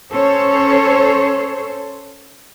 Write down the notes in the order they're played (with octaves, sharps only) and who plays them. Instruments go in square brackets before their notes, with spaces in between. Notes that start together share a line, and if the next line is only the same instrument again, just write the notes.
[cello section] C#4 A4 C5 C#5